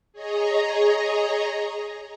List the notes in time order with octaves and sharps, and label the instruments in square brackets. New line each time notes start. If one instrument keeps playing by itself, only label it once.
[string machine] G#4 C#5 D#5 A#5